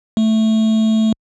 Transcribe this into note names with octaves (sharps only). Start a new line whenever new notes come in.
A3